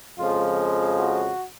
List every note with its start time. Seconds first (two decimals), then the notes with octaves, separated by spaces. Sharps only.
0.17 F2 C#3 F3 G#3 F4
0.98 F#4